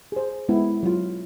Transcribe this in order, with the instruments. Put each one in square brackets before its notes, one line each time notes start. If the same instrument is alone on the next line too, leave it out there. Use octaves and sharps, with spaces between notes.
[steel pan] G#4 C5
G#3 B3 E4
F#3 F4